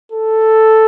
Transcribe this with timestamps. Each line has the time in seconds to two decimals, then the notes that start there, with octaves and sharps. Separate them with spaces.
0.12 A4